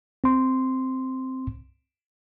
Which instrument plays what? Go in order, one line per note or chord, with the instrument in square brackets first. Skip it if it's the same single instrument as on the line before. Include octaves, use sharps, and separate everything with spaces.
[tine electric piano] C4 C6